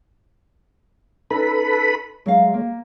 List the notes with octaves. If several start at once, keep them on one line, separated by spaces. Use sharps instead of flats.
C#4 D#4 A4 B4 B5
F#3 G#3 E5 F5
A#3